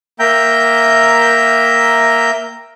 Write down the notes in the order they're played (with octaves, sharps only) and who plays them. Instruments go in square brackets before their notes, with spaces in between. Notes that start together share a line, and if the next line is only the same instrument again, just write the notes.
[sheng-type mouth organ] A#3 E5 G5 A#5 G6